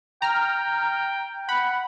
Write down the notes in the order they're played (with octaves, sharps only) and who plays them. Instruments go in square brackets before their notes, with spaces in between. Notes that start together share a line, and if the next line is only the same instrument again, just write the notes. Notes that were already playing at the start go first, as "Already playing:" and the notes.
[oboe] G5 [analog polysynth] A#5 F6
[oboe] F#5 [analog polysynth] B5